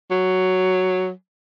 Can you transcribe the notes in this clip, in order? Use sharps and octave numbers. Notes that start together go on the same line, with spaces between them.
F#3